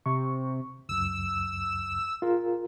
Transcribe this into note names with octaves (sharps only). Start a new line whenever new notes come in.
C3 C#6
C#2 F#2 E6
F4 G#4 A#4